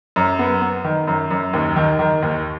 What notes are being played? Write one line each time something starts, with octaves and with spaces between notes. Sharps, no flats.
F#2
B3
B3
D#3
F#2
F#2
D#2
D#3
D#3
D#2